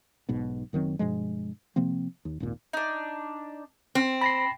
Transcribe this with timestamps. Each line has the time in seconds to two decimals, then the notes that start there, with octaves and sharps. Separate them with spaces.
0.29 B1 G#2 B2
0.73 F#1 D#3 F#3 C4
0.99 G2 B2 F3 G#3
1.76 C3 F3 A#3 C4
2.25 D#2
2.40 G#1 D#2 A#2
2.73 D4 D#4
3.95 C4
4.21 A5 B5 A#6 C7